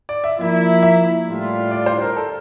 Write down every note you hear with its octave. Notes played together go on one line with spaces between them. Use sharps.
D5
E5
F3 A#3 E4 E5
E5
A2 G3 D4 F4
D5
C5
A#4
A4